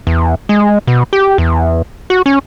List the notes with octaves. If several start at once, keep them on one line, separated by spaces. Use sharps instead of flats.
E2
G#3
B2
G4
E2
F#4
C#4